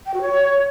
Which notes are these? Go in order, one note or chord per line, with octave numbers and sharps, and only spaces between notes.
G5
F#4
C#5